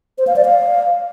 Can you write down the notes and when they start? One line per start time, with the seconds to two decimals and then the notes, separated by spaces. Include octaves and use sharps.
0.18 C5
0.27 F5
0.36 D5
0.45 F5